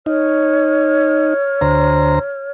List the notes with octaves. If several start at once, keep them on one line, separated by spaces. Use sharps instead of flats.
D#4 C#5 F6
D2 C5 A#5